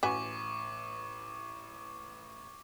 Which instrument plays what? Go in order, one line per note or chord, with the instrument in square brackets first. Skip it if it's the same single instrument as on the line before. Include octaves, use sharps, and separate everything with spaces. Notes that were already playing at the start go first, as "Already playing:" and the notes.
[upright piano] A1 [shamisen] F#4 B4 G#5 [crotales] C#6 D6